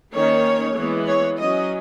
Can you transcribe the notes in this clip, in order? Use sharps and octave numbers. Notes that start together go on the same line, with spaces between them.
D#3 A#3 C#4 C#5
E3 G#3 B3
C#5
F#3 C#4 D#5